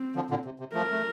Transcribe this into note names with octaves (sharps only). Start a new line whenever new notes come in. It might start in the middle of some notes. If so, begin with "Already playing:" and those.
Already playing: C4
D3 F3
A#2 D3
C3
C3
F3 A3 A#4
A3